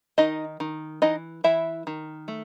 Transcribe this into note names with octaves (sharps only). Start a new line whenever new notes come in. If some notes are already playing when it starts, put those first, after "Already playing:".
D#3 D#4 D#5
D#3
E3 D#4 D#5
E3 E4 E5
D#3
A3